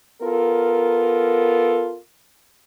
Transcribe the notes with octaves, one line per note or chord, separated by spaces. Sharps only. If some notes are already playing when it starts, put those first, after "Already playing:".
B3 F4 A4 A#4